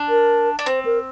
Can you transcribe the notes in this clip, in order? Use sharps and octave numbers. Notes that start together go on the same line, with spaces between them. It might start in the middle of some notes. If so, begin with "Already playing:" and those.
Already playing: D4
A#4
D4
C4 C5
A#4